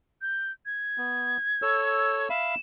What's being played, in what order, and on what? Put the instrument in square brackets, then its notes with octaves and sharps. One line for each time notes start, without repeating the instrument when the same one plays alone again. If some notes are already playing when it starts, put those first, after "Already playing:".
[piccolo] G6
G#6
[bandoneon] B3
A4 C#5 E6
[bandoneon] E5 F5 B5 [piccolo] E7